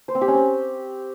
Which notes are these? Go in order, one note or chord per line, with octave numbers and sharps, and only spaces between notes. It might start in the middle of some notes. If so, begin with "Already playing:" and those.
C5
C4
G4
C#4
C4